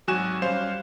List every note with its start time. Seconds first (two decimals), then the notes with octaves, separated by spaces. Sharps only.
0.08 G#1 F#3 F#4 G#5 F#6 E7
0.42 G3 C#4 C5 F5 E7